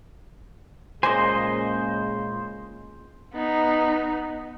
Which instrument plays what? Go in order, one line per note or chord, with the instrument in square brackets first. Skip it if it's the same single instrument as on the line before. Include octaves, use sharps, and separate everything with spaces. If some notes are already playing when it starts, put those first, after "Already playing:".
[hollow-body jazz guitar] A#2 A#3 G#5 [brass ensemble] C#3 G#3 [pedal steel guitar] C5 D#5
[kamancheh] B3 D#4